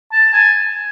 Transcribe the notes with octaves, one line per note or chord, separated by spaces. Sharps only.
A5
G#5